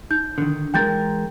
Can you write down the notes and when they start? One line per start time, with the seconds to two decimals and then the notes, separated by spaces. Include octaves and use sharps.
0.10 D#4 G6
0.38 D3 D#3
0.74 E3 G#3 A#4 G5 G6 A6